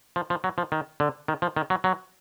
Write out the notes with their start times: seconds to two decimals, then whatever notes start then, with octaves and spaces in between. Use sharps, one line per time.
0.16 F3
0.30 F3
0.44 F#3
0.58 F3
0.72 D#3
1.00 D3
1.28 D#3
1.42 F3
1.56 D#3
1.70 F#3
1.84 F#3